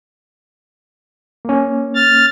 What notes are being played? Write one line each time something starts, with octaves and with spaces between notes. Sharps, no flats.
A#3 C#4
F6 A6